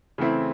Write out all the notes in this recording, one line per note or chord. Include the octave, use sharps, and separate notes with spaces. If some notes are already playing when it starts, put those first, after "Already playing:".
C#3 E3 A3 C4 E4